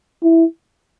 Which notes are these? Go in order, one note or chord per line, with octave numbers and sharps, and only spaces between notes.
E4